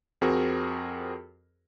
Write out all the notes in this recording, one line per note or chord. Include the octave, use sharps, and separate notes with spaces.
F2 C4 F#4 G#4 A#4